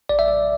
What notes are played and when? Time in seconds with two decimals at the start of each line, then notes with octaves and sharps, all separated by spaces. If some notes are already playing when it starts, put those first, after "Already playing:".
0.09 A1 D5
0.19 E5
0.28 D5